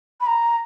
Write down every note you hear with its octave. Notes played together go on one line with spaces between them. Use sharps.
B5
A#5